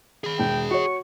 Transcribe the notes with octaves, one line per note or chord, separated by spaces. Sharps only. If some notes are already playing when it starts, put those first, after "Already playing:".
G#4 B5
E1 G5
F#4 C#5 C#6